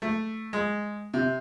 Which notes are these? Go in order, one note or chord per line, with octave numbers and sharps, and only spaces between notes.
A3
G#3
C3